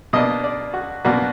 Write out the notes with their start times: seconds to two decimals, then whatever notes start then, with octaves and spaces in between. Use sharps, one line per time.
0.13 B2 A#3 D4 D#5
0.44 D5
0.74 F#4
1.05 B2 A#3 D4 F#4